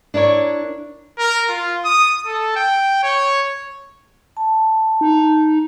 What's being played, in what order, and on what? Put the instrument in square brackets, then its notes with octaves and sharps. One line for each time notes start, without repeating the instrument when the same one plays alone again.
[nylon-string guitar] D4 E4 A#4 C#5
[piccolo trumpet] A#4
F4
D#6
A4
G5
C#5
[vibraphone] A5
[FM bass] D#4